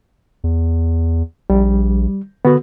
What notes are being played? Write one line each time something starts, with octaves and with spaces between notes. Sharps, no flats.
E2
A#1 G3
D3 B3 F#4